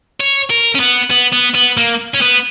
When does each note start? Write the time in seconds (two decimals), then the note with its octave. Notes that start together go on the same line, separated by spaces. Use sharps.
0.20 C#5
0.50 A#4
0.75 C#4
0.80 B3
1.10 B3
1.32 B3
1.54 B3
1.77 A#3
2.15 C#4
2.22 B3